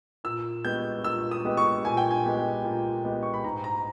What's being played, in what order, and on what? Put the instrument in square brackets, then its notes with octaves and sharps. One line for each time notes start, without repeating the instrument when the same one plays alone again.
[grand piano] A#2 [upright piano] E6
[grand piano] G#3 B3 G4 [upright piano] G6
[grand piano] A#2 [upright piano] E6
[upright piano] D#6
[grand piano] G#3 B3 G4
[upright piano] C#6
[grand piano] A#2 [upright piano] G#5
[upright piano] G5
G#5
[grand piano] G#3 B3 G4
A#2
G#3 B3 G4
[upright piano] C#6
B5
[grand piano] G#2 [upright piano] A#5
[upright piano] A#5